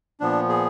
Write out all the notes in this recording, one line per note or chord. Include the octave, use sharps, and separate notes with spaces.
A#2 F3 B3 D4
G#4